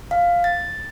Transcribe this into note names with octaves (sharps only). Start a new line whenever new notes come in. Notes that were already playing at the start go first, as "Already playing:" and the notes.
F5
A6